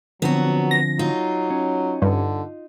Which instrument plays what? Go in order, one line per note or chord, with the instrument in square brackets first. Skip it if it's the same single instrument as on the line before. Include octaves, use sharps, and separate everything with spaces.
[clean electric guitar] D3 F3 C4 [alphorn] F#3 [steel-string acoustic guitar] B3 F#4
[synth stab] A#6
[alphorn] F#3 [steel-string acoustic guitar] D#4 F4
[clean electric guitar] C#4
[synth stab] G2 [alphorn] D3